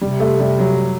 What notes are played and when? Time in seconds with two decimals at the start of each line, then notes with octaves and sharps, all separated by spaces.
0.01 C3 G3
0.20 A3
0.40 G3
0.59 F#3